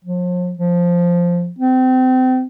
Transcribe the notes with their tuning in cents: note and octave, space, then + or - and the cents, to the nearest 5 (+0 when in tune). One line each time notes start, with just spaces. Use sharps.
F3 +40
F3 +0
C4 -30